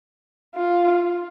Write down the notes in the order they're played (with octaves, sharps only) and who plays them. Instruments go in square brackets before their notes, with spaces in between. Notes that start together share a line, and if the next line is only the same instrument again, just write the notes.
[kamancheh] F4